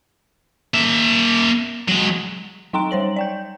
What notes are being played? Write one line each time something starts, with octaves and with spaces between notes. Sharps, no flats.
A#3 E5
F#3 G#3
F#3 D#4 G5 A#5 C6 D7
G3 C5 C#5 F#7
D5 G5 G6